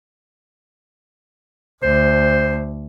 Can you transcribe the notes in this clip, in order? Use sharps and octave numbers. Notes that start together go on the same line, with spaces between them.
D2 C5